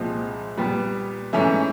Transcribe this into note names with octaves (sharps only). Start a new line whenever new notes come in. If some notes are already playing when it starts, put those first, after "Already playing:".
Already playing: C2 A#2 F3 G#3 C4
A#2 G3 B3
G#2 E3 A3 C#4 E4